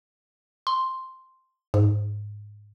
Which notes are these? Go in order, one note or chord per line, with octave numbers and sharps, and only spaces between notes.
C6
G#2